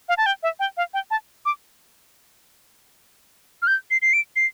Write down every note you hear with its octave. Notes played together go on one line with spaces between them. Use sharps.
F5
A5
G5
E5
G5
F5
G5
A5
D6
F6
G6
C7
C7
D7
C7